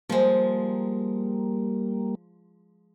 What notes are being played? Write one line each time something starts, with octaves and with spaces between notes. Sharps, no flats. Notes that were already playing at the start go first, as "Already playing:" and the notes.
F3 G3 G#3 A#3